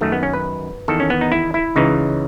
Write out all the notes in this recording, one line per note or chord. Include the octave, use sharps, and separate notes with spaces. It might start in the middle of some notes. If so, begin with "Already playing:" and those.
F#2 D#3 A3
B3
C#4
B4
E2 D#3 A4
C#4
B3
D#4
E4
E4
C#2 C#3 E3 D#4